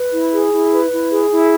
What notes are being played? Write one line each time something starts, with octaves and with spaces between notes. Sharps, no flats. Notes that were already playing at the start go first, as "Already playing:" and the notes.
Already playing: B4
E4
G#4
E4
B4
E4
G#4
E4